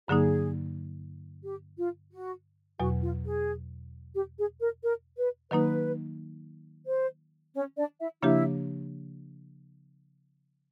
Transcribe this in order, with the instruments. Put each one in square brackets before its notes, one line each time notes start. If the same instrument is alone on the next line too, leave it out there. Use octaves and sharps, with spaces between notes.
[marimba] G2 D3 F#3 A#3 D#4 [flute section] G#4
[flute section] G4
F4
F#4
[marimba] E2 B2 F#3 [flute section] F#4
[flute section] F4
G#4
G4
G#4
A#4
A#4
B4
[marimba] D#3 F#3 A#3 D#4 [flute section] B4
[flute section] C5
C#4 C#5
D4 D5
E4 E5
[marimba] C#3 F3 A#3 D4 G4 [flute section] E4 E5